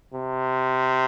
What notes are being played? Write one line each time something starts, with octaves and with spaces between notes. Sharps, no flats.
C3